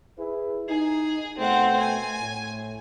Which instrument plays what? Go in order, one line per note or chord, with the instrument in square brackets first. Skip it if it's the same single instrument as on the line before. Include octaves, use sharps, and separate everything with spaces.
[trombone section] E4 G#4 B4
[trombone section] D#4 [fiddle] G#4
[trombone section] B2 A3 [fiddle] C4 F#5
[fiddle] G#5
[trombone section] A2